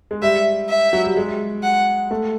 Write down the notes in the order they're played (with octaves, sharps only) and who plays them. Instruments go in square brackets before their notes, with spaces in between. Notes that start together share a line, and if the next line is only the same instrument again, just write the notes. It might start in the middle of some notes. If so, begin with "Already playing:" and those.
[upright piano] G#3
[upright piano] G3 [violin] E5
[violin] E5
[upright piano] F#3
G3
G#3
[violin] F#5
[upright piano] A3